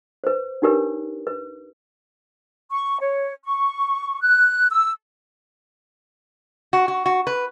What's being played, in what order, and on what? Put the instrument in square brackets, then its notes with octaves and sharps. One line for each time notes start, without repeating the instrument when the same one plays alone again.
[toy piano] B4 C5
D4 D#4 G4 A#4 B4 C#5
B4
[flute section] C#6
C#5
C#6
F#6
E6
[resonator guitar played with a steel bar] F#4
F#4
F#4
B4